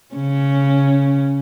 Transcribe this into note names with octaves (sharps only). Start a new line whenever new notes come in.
C#3 C#4